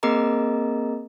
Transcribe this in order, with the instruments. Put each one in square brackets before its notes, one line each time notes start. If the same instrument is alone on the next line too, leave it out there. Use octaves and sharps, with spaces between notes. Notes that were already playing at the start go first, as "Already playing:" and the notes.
[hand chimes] A#3 C4 G#4 A#4 D#5 A#5